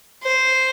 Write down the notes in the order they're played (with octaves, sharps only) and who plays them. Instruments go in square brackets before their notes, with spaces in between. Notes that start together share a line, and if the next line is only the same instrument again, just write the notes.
[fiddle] C5